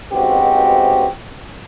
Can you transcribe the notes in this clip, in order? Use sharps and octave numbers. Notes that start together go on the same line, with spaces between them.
C#2 G#2 B2 C4 F#4 G4